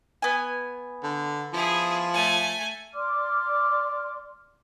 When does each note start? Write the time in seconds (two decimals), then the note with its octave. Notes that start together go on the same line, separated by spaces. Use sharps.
0.22 B3 G#5
1.03 D3
1.53 F3 E4 G#4
2.14 A3 G#5
2.94 D5 C6 D6 F6